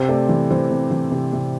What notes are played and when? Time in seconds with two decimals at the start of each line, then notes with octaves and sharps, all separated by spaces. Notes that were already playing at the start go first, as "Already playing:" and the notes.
Already playing: C3 C5
0.09 A3 D5
0.29 E3
0.51 E3 C5
0.71 C3
0.91 E3
1.12 C3
1.33 C3